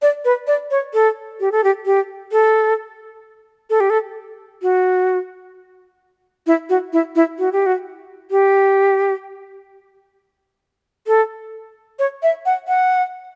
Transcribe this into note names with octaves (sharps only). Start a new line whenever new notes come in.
D5
B4
D5
C#5
A4
G4
A4
G4
G4
A4
A4
G4
A4
F#4
E4
F#4
E4
E4
F#4
G4
F#4
G4
A4
C#5
E5
F#5
F#5